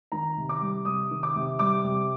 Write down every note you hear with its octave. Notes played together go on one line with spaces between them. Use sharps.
D#3 A#5
C3
D6
G3
C3 D#6
D#3
D6
C3
G3 D6
C3